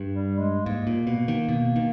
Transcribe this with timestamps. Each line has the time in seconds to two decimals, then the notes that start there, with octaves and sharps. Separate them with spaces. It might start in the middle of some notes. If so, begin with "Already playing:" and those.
Already playing: G2
0.11 G3
0.38 G#3
0.66 G#2 A#3
0.87 A#2
1.07 B2
1.28 D#3
1.49 B2
1.76 D#3